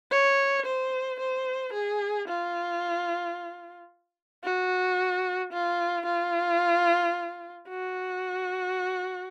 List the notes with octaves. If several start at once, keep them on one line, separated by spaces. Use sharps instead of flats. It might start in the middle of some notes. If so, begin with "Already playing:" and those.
C#5
C5
C5
G#4
F4
F#4
F4
F4
F#4